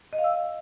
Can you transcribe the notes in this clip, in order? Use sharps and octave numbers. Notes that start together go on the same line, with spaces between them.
D#5
F5
E6